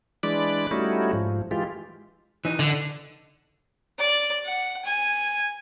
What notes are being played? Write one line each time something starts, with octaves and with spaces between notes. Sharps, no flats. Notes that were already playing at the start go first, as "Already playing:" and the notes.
E3 G#3 D4 D5 B5 D6
G3 A3 C#4 D#4 E4 F#4
G#2 F3
E3 G#3 F4 G4
E3 D#4
D3
D5
F#5
G#5